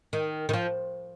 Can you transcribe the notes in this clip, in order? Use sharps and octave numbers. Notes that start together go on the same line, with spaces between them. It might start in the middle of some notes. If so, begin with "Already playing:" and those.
D#3
D#3
F3